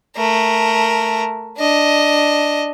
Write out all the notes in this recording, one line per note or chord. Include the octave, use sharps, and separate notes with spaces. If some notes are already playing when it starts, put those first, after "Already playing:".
A3 A#4
D4 D#5